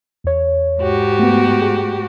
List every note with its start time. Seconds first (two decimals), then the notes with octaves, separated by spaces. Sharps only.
0.24 E2 C#5
0.81 G#2 F#4 G4
1.19 A3 B3
1.62 G#4